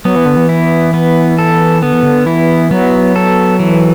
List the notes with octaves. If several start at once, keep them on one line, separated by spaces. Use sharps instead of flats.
F#3 B3
E3
D3
E3
E4
B3
A4
D3 B3
E3
D3
E3 E4
F#3 B3
A4
E3